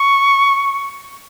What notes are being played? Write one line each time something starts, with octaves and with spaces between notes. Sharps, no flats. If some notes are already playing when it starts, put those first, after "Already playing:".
Already playing: C#6